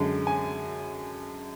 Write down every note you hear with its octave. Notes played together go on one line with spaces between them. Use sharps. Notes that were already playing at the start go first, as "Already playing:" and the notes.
Already playing: F#2 D3 G#3
G#5